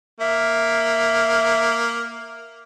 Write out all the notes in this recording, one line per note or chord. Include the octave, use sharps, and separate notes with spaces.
A#3 E5